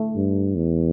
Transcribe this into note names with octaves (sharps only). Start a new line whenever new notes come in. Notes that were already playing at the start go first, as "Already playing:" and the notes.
Already playing: A3
G2
E2